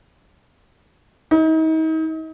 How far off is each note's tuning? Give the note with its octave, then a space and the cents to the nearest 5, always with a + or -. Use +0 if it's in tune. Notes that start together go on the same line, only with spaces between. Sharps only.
D#4 +40